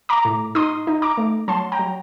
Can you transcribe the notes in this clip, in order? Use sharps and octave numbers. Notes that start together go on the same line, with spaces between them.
A#5 D6
A2
D#4 C6 D#6
D#4
A#5 D6
A3
F#3 A5 C6
G5 A#5
F#3